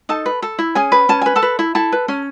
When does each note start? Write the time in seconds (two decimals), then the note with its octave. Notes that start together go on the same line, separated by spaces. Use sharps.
0.09 D#4 A4 A5
0.26 B4
0.42 A4
0.59 E4
0.75 C#4 G#4 G#5
0.92 B4
1.09 C#4 A5
1.22 B4 G#5
1.36 A4 A5
1.42 B4
1.59 E4
1.75 E4 A4 A5
1.92 B4
2.08 C#4